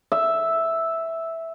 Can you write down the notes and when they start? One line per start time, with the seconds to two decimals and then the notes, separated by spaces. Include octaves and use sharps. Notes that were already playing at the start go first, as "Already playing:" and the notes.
0.12 E5